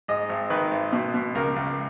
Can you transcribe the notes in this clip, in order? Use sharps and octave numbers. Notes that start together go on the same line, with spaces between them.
G#2 D#5
G#1
D#3 B4
G#1
B2
B2
C#2 A#4
C#2